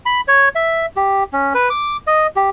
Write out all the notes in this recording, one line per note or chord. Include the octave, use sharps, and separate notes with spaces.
B5
C#5
E5
G4
C#4
B4
D6
D#5
G4